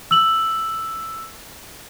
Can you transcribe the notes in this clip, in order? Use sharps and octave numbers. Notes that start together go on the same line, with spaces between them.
E6 F#7